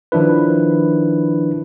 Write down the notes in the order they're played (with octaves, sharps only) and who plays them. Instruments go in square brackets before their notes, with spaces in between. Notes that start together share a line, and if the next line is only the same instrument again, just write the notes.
[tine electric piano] D#3 F3 D4 E4 B4